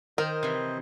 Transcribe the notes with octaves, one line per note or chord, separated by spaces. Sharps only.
D#3 A#4 C5 D#5
C3 E3